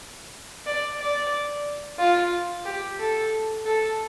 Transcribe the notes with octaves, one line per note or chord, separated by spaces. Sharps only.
D5
D5
F4
G4
A4
A4